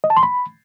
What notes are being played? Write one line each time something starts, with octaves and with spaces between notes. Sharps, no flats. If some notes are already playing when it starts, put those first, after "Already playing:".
D#5
A5
C6
B5